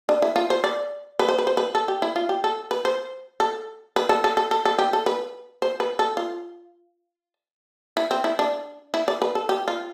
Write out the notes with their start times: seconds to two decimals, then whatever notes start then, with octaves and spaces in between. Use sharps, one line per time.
0.09 D4
0.22 E4
0.36 F4
0.50 C5
0.64 D5
1.19 B4
1.29 C5
1.38 B4
1.47 C5
1.57 B4
1.75 A4
1.88 G4
2.02 E4
2.16 F4
2.29 G4
2.44 A4
2.71 B4
2.85 C5
3.40 A4
3.96 B4
4.09 A4
4.24 A4
4.37 A4
4.51 A4
4.65 A4
4.79 G4
4.93 A4
5.06 B4
5.62 C5
5.80 B4
5.99 A4
6.17 F4
7.97 E4
8.11 C4
8.24 E4
8.39 D4
8.94 E4
9.08 D5
9.22 B4
9.35 A4
9.49 G4
9.68 F4